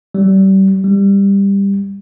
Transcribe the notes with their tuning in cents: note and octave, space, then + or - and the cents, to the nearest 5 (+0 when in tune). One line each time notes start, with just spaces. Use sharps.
G3 -30
G3 +15